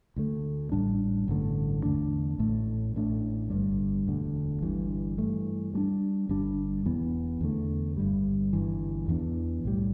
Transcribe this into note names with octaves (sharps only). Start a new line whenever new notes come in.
D2 D3 A3
A1 A2 G3 D4
A1 G2 D3 A3
E2 D3 A3 D4
A1 A2 A3
A1 A2 A3 D4
G1 G2 G3
E1 D2 D3
G1 G2 E3
G2 E3 A3
G2 G3 D4
G1 G2 G3 D4
E1 E2 E3 B3
E2 D3 A3
G1 G2 G3
G1 G2 E3
E2 E3 B3 D4
B1 A2 G3